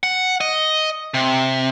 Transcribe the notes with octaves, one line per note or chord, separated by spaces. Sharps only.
F#5
D#5
C3